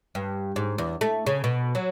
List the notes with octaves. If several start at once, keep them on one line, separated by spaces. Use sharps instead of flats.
G2
G#2
E2
A3
C#3
B2
F#3